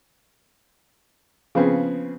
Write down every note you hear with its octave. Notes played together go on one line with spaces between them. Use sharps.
C#3 F3 B3 C4 G#4